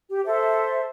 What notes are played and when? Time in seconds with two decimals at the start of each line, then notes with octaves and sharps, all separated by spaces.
0.10 G4
0.25 A4 C5 E5